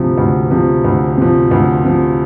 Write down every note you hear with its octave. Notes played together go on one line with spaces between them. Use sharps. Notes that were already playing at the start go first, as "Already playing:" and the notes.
Already playing: D2 C3 F3
D2
C3 F3
D2
C3 F3
D2
C3 F3